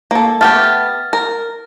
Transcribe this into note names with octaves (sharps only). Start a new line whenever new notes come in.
A#3 A4
A3 B3 G4 F6 A6
A#4